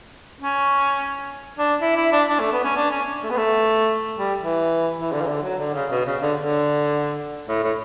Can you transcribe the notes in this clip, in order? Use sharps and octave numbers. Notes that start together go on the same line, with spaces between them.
C#4
D4
E4
E4
D4
D4
A3
B3
C#4
D4
C#4
A3
B3
A3
G3
E3
E3
D3
E3
D3
F#3
D3
C#3
B2
C#3
D3
D3
A2
A2